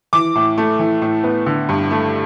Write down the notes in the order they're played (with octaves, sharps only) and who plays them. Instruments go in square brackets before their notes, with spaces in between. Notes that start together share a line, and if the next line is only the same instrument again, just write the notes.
[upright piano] E3 D6
A2
A3
E3
A2
B3
D3
G2
A3